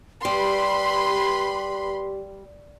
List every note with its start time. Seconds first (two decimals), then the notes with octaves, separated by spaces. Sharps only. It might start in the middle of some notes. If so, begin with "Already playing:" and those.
0.25 G3 G4 B4 B5 C6